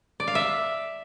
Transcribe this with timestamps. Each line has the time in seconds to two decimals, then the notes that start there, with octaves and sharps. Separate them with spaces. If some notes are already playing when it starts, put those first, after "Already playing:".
0.20 D5
0.27 F5
0.35 E5